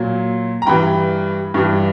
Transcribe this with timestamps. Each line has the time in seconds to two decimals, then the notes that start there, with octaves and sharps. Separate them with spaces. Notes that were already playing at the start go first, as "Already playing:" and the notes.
Already playing: A#2 F#3
0.62 A#5
0.67 G2 E3 G3 G5 B5
1.54 G2 E3 G3